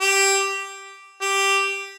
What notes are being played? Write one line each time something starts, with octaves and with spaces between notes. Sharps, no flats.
G4
G4